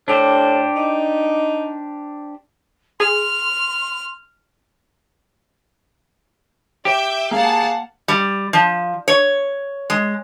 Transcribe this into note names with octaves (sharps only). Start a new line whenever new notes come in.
A2 D4 G4 C5
D#4
G#4 C6 F6
G4 E5 D6 G6
A#3 G#4 F5 F#5 A5
G3
F3
C#5
G#3